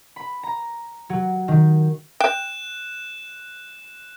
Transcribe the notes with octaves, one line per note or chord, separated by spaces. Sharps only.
B5
A#5
F#3
D#3
G5 F#6 E7